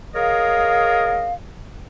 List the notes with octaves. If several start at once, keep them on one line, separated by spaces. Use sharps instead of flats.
G#4 A#4 C#5 D#5 F5